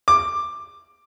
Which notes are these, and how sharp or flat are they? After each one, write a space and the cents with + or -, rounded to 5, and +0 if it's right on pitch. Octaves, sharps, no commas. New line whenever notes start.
D6 +10